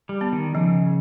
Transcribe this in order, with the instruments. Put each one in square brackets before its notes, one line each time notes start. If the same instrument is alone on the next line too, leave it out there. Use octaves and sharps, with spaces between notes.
[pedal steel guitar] G3
[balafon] B3
[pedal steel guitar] D#3
[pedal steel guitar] C#3 [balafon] F3